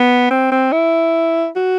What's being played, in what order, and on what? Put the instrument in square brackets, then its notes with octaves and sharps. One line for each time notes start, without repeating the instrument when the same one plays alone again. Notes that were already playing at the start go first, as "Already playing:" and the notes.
Already playing: [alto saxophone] B3
C4
C4
E4
F#4